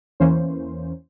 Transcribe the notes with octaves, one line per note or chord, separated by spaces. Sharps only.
E2 E3 A#3 C#4 C5